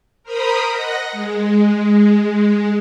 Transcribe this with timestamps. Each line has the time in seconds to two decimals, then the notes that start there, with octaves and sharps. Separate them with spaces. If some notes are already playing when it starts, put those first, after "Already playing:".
0.23 A#4 C5 A#5 B5 D#6
0.69 D#5 F#5 A#6
1.12 G#3